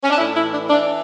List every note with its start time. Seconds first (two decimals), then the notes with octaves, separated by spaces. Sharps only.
0.03 C#4
0.10 D4
0.17 A2 E4
0.35 E4
0.44 E3
0.52 D4
0.69 E3 D4